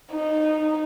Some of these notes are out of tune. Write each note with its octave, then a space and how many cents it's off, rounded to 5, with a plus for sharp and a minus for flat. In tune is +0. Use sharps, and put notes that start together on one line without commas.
D#4 -15